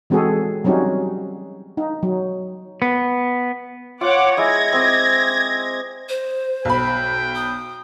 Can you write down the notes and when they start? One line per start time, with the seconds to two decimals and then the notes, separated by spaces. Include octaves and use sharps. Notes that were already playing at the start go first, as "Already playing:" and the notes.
0.10 E3 G#3 C4 F#4 G#4 A4
0.64 F#3 G3 C4 C#4 D#4 F#4
1.77 D#4
2.03 F#3
2.82 B3
4.01 F4 C#5 F#5 D6
4.37 G#3 E4 D#5 G#6 A#6
4.73 C4 D#5 D6
6.09 C5
6.65 B1 G5 B5
7.35 D#6